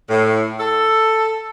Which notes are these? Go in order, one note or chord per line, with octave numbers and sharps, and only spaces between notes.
A2
A4